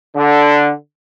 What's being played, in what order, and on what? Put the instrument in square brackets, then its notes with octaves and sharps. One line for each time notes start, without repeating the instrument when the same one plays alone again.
[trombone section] D3